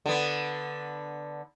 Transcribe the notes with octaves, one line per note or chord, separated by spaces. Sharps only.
D3 B3